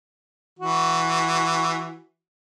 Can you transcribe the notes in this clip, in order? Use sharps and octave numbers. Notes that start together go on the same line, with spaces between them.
E3 F#4